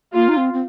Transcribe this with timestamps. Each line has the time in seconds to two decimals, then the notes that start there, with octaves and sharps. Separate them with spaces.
0.14 A#3 F4
0.29 D#4
0.37 C4
0.54 C4